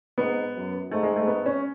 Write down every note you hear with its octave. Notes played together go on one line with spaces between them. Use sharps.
G#2 B3
F#2
G#2 A3
G#3
A3
B3
C#4